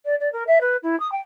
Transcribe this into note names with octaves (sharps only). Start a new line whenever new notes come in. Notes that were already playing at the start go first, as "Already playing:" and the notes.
D5
D5
A#4
E5
B4
E4
D#6
G5